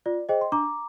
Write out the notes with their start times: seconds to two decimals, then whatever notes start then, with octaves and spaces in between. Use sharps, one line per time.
0.06 F4 D5
0.29 G#4 C5 D#5 G5
0.41 C6
0.52 D4 A#5 D6